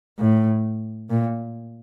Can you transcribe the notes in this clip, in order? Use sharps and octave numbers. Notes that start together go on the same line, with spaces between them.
A2
A#2